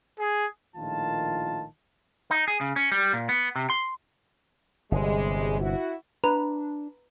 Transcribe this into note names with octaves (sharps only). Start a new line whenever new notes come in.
G#4
A#1 A2 D#3 F4 A5
D#4
G#4
C#3
C#4
G3
A#2
B3
C3
C6
G1 C3 G3 G#3
E4 F#4
D4 B4 A#5